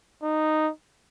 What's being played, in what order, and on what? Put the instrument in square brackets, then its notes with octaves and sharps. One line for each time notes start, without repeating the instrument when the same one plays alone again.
[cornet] D#4